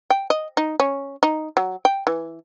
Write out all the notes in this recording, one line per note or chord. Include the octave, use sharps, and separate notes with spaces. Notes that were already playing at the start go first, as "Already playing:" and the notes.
G5
D#5
D#4
C#4
D#4
F#3
G5
E3